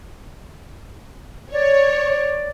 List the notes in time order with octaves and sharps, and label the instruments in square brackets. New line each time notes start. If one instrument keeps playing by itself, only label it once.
[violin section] C#5 [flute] D5